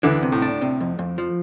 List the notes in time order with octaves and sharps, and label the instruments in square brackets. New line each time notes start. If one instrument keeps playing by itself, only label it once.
[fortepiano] D2 D3 [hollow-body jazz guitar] E3
[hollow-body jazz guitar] C3
[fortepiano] A2
[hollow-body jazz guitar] D4
C3
F2
F2
F3